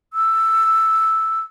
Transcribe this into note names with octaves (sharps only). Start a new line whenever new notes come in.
E6